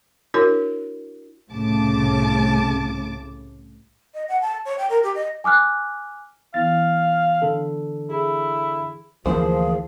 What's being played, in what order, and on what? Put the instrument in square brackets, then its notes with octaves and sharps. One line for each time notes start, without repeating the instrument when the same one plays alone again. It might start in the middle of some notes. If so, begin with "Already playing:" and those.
[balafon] D4 E4 F#4 A#4 C#5
[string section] C2 A2 C#3 A5 D6
[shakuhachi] D#5
F#5
A5
C#5
G5
A#4
G4
D#5
[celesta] G#5 D6 F6 F#6
[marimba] E3 B3 E4 [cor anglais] F5 [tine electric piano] A6
[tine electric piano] D3 D4 A4
[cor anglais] E4 [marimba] G#4
[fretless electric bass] D2 E3 A#3 [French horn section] F3 [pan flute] G#4 [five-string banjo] C5